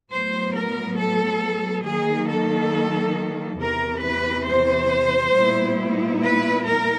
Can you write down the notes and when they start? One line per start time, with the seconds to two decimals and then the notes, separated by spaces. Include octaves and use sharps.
0.12 A2 F#3 B3 C5
0.55 A#4
0.99 A4
1.86 D#3 F#3 A#3 D#4 G#4
2.30 A4
3.60 E2 C3 E3 A#4
4.03 B4
4.48 C5
5.35 A#2 G3 B3 E4
6.22 B4
6.65 A#4